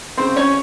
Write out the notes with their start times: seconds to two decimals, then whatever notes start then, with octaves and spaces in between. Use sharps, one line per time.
0.17 C#3 C4 C5
0.36 C#4 C#5